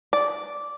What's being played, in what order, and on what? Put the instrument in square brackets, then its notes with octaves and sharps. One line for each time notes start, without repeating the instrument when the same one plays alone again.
[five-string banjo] D5